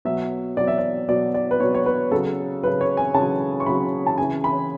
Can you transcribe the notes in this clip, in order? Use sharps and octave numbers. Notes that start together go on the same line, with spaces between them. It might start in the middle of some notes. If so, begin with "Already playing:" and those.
B2 F#3 E5
B2 F#3 D5
E5
D5
B2 F#3 D5
D5
B4
B2 F#3 C#5
C#5
B4
C#3 F#3 A4
C#3 F#3 B4
C#5
G#5
C#3 F#3 A5
C#6
C#3 F#3 B5
A5
C#3 E3 G#5
B5